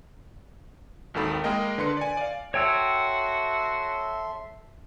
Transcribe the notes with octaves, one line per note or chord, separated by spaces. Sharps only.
G#1 D#2 D#3 A4 B5
G#3 A#3 A#4 D#5 G5
D3 B4 C6 C#7
D5 G#5
D5 F5
F#4 A4 C#5 E5 G5 C6 E6